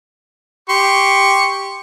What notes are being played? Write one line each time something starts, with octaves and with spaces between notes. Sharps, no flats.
G4 C6 C#6